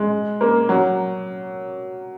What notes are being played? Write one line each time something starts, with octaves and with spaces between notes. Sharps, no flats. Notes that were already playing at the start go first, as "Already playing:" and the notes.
Already playing: G#3
A#3
F#3